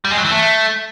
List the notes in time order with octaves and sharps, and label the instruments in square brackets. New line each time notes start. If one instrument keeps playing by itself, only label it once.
[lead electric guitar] G3
G#3
F#3
E3
A3